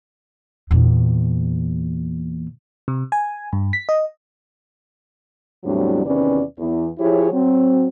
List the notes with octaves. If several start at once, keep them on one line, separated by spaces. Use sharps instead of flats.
E2 A#2
C3
G#5
G2
B6
D#5
E2 A2 F#3 G3 C4 D4
E2 C3 D#3 C#4 B4 D5
E2
F3 E4 G4 G#4 C#5
F#3 C4